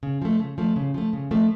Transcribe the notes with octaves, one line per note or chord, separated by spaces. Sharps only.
C#3
F3 A3
C#3
F3 A3
C#3
F3 A3
C#3
F3 A3